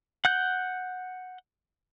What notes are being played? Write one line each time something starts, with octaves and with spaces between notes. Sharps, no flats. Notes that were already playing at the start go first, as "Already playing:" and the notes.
F#5 F#6 G6